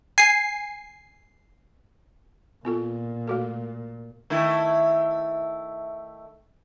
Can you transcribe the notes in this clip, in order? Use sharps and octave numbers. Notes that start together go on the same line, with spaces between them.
G#5 C7
A#2 B3 F4 A4
A3 F#4 A4
D#3 A3 E4